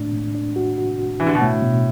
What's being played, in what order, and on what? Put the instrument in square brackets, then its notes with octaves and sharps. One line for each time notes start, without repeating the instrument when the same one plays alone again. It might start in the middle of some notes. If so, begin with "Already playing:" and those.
Already playing: [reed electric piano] A2 D4
A2
D4
F#4
F#4
F#4
[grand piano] E3 [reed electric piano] D4
[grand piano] D3
B2
[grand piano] A2 [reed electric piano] A3
[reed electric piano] B2